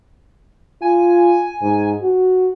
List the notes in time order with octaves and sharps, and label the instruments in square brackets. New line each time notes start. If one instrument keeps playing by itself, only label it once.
[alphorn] F4 [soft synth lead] G#5
[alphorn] G#2
F#4